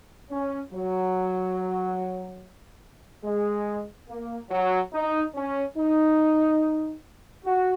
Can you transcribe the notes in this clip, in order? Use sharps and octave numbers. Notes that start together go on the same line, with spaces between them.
C#4
F#3
G#3
A#3
F#3
D#4
C#4
D#4
F#4